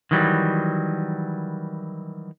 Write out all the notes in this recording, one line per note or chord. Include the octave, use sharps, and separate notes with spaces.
D#3 E3 F#3 G3